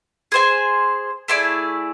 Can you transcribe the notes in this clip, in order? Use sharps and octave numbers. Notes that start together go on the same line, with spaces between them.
G#4 C5 G#5
A3 E4 G#4 D5